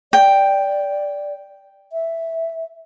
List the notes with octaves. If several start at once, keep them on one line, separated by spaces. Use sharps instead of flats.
D5 G5
E5